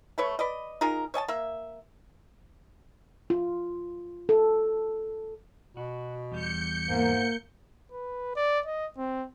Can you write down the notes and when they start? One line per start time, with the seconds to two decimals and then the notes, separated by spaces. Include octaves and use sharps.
0.18 A3 B4 C#5
0.39 B4 D5 D#5
0.81 D#4 F4 G#4 A#4
1.14 C#5 D#5 G#5 A5
1.28 A#3 E5
3.30 F4
4.29 A4
5.77 B2 F#4
6.32 E2 G3 G6 C#7
6.89 G#2 A#3
7.92 B4
8.36 D5
8.66 D#5
8.97 C4